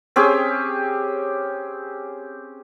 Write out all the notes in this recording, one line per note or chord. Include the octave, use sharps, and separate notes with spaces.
C4 C#4 G4 G#4